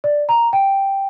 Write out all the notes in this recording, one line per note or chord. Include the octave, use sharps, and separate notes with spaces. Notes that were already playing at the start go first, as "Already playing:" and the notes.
D5
A#5
G5